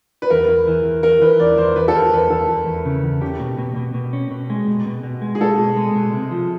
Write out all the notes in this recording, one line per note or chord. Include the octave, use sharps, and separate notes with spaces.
B4
E2 A#4
E2
E3
E2
E3 A#4
E3 B4
E2 D5
E2 C5
E2 B4
A4
E2 A#4
E2 B4
E2 A4
E2
E2
C#3
E2
C#4 G4
B2
B2
B2
B2
C#4
B2
G#3
B2
B2
B2
G#3
G#4
G#3 A4
B2
G#3
B2
C3
F3